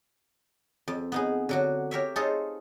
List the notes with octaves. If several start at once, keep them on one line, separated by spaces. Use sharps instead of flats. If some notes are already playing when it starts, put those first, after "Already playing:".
F2
B3 D#4 G#4
D3 F#3 F#4
G4 A#4 C#5 E5
D#4 F4 G#4 A4 C5 C#5